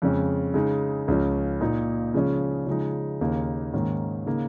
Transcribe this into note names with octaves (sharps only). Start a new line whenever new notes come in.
F2 C#3 G#3 C#4
C#3 G#3 D#4
C#2 C#3 F3 C#4
A#2 A#3 D#4
C#3 F3 G#3 C#4
C#3 F3 G#3 D#4
D#2 C#3 A#3 D#4
G#2 D#3 A#3 C#4
C#3 A#3 D#4